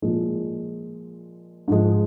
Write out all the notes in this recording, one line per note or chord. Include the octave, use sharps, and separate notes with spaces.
A#2 F3 G#3
G#2 F3 G#3